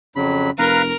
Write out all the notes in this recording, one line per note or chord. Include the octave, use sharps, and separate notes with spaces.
F2 C#3 F#3 B5
F1 A#4 B4 F5 A#5